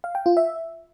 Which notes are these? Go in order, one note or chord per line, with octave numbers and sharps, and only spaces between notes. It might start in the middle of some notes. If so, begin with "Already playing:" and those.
F5
G5
F4
E5